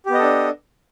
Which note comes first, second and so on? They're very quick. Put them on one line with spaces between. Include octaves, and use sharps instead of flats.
G4 B3 D#5 A4 D4